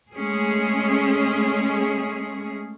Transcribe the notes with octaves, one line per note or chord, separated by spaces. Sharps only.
G#3 A3 C#4 G#4